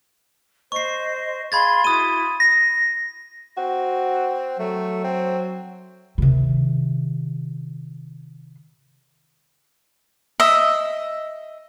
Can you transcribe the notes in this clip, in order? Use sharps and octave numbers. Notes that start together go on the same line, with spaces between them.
C5 D#5 C#6 C7
G#4 F5 B5 C6 G#6 A6
E4 F#4 D#6 D#7
A#6
C4 F#4
F#3 A3
C4
C3 D#3
D#5 E5